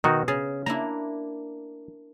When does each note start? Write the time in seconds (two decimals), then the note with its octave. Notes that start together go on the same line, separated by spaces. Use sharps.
0.04 B2 D#3 D#4 F#4
0.28 C#3 G#4
0.66 A#3 D4 E4 A#5